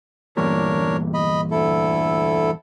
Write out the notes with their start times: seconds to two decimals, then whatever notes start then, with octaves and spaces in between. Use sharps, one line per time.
0.37 E2 G2 A#2 D4 A#4 C#5
1.14 D#5 B5
1.51 D2 E4 A4